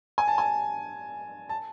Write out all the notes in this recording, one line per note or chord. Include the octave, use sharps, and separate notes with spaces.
G#5
A5
G#5
A5